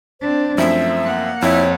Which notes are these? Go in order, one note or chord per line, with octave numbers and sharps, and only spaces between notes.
C4 D4 C5
F#2 F3 A3 C4 E5
A#3 F#5
F2 E4 C#5